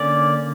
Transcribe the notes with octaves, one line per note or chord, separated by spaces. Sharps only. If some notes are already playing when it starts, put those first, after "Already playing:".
Already playing: D3 A#3 C#4 D5